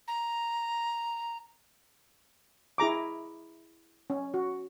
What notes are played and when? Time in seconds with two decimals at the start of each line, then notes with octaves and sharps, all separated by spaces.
0.08 A#5
2.78 E4 G#4 A#5 D6
4.10 C#4
4.34 F#4